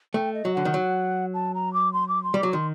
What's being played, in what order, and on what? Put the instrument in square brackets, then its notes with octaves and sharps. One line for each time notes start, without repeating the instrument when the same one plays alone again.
[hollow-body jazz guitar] A3 [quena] G5
[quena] D#5
[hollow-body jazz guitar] F#3
[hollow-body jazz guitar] D3 [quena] F#5
[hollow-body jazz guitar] D#3
F#3
[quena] A5
A#5
D6
C6
D6
C6
[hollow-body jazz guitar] G3
[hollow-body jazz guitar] F#3 [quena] D6
[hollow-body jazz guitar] D#3 [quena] C6